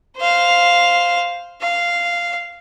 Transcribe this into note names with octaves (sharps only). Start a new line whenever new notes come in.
C5 F5
F5